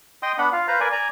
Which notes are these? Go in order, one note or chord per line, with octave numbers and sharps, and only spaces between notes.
D#5 G5 C6 D#6
B3 D4 F#5 B5
F4 F5
B4 C5 F5 A#5
A#4 B4 D5 G#5
D5 G#5 A#5